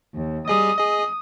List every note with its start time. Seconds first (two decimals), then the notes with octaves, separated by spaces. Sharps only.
0.14 D#2
0.48 G3 G#4 D#5 D#6
0.77 G#4 D#5